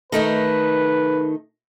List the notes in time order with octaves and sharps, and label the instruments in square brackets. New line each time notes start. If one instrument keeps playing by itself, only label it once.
[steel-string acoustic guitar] D#3 A3 D#4 [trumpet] B4